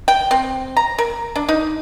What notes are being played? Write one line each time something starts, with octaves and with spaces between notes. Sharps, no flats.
G5
C4
A#5
A#4
D4
D#4